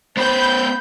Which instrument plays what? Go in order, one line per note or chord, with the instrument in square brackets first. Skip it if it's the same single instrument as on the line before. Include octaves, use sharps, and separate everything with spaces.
[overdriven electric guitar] B3 C5 [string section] B5 G6